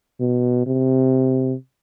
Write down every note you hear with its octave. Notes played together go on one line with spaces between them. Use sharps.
B2
C3